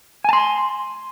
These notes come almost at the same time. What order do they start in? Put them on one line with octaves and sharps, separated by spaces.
G#5 A5 C6